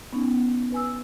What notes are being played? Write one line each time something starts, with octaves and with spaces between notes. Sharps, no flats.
B3 C#4 D#4
B4 G#5 E6